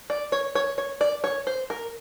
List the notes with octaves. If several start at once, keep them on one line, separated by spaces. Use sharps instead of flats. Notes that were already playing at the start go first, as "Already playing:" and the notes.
D5
C#5
C#5
C#5
D5
C#5
C5
A#4